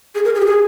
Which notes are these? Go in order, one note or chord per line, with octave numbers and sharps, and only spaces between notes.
G#4
A#4
G#4
G4
G#4